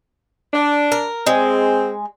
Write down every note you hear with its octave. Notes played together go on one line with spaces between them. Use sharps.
D4
A#4
G#3 C4